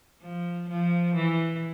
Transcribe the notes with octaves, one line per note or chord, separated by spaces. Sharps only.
F3
F3
E3